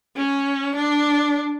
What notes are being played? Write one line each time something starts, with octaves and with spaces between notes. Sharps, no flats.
C#4
D4